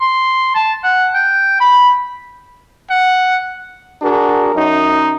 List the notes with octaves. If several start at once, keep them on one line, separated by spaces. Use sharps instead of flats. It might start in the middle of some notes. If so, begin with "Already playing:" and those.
C6
A5
F#5
G5
B5
F#5
D4 F#4 G#4 A#4
F#2 D#4